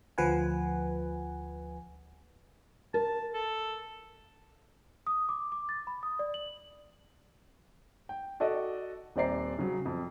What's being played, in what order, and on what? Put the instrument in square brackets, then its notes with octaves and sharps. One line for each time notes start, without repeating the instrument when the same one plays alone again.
[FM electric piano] D2 F3 B4 F#5 G#5
[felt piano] A#4 [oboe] A5
[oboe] A4
[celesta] D#6
D6
D6
A6
B5
D#6
D5
F#7
[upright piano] G5
F#4 A4 D5 D#5
D#1 C4 C5 D5 A#5 C7
C#3 F#3
F2